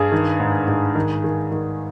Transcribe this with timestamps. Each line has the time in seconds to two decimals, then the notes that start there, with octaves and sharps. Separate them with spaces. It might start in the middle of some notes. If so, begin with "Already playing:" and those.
Already playing: G2 G#4
0.12 D#3
0.40 G#2
0.67 G#2
0.95 D#3
1.24 D#3
1.52 D#3